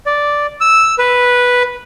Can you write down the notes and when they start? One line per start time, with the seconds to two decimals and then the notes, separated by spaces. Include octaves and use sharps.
0.06 D5
0.61 E6
0.99 B4